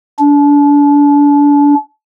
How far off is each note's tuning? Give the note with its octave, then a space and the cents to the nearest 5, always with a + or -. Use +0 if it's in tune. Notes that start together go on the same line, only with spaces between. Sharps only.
D4 -30